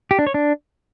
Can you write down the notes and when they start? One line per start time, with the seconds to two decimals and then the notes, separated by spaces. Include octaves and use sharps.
0.11 G4
0.19 D4
0.27 C#5
0.34 D4